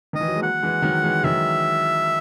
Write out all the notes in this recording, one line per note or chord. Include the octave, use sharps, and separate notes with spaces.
D#3 D#5
E3
F#3
G#3
F#3 A#3 F#5
E3 G#3
D#3 F#3
E3 G#3
D#3 F#3 E5